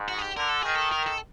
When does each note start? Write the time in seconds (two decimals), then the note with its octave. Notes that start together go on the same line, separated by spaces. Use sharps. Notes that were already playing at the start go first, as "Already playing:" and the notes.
Already playing: G#2
0.08 F#4
0.18 G#4
0.22 G4
0.36 D3 A#4
0.49 A4
0.63 D#3 G#4
0.76 A4
0.92 A#4
1.07 A4